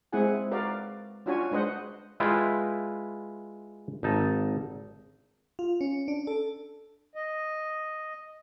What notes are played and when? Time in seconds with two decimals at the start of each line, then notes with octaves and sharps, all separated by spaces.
0.13 G#3 C4 E4 G#4 F#5 G#5
0.51 F#4 A#4 B4 D5 F5
1.26 C#4 D4 F4 F#4 C#5 G#5
1.52 G#3 D4 B4 C5 D#5 F#5
2.20 G#3 E4 F4 B4 G5
4.03 G#1 D#4 A5
5.59 F4
5.81 C#4
6.08 D4
6.27 A4
7.16 D#5